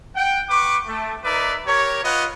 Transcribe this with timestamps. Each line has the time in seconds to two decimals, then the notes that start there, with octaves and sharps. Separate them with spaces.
0.15 F#5 G5
0.49 B4 C#6 D6
0.87 A3
1.23 D#4 A#4 B4 D5 E5
1.66 G4 A#4 C#5
2.03 F4 B4 C#5 D#5 F#5